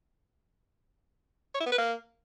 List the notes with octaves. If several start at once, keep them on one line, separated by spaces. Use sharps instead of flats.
C#5
E4
B3
B4
A#3